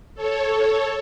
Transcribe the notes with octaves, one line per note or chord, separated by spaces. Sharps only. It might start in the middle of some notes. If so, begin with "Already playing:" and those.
A4 C#5